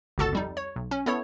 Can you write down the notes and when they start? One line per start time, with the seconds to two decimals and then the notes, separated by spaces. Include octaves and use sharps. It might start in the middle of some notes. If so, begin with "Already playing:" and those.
0.18 G1 C#2 F#4 A4 A5 A6
0.33 F2 G3 D#4
0.57 C#5
0.76 B1
0.91 C#4
1.06 B3 E4 A4 C#5